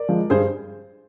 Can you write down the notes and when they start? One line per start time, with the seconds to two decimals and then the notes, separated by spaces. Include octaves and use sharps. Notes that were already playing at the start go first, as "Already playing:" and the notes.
Already playing: A#4 D5
0.09 F3 G#3
0.30 G2 G#4 C5